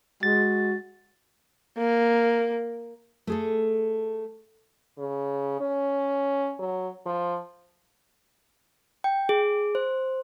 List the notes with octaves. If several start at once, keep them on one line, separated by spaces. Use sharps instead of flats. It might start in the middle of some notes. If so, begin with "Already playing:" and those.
G#3 F#4 A6
A#3
A3 G#4 A4
C#3
C#4
F#3
F3
G5
G#4
C5